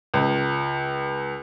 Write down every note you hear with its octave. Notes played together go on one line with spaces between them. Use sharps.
C#2